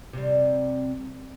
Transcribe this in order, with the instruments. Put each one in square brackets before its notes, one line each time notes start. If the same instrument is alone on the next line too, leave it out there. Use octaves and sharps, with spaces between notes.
[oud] C3 G3